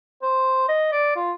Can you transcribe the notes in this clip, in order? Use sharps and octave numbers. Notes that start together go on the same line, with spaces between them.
C5
D#5
D5
F4